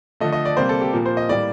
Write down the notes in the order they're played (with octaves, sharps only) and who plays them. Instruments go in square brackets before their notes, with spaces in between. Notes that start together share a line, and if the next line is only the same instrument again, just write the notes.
[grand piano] D3 F3 A3 D#5
D#5
D5
C3 G3 A#3 C5
A4
G4
A#2 F3 A#3
C5
D#5
A2 G3 A#3 D5